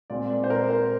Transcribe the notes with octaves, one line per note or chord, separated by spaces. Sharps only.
A#2 G#3 C4 D5
D5
C5
A#4
C5